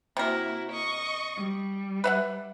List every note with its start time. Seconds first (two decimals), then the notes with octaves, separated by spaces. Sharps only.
0.17 C3 A#3 E4 F#4 A#4
0.71 D#5 C#6
1.35 G3
2.04 B4 E5 F#5